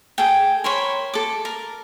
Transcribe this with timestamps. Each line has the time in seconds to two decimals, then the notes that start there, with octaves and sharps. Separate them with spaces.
0.18 G#4 A4 G5
0.64 A#4 C5 C#5 B5
1.14 A4 D6
1.45 A#4